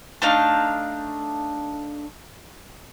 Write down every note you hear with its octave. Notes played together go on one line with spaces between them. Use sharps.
A3 D4 D#4 F5